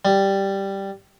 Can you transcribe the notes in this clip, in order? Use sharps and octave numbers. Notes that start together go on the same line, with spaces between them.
G3